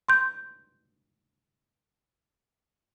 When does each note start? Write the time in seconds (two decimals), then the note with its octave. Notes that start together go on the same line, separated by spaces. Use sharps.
0.09 C6 G6